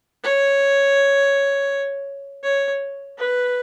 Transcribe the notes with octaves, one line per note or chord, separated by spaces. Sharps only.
C#5
C#5
B4